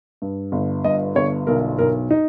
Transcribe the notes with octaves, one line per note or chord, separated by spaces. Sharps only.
G2
G1
G2 D#5
G1 C#5
B1 A#4
B1 A#4
D#4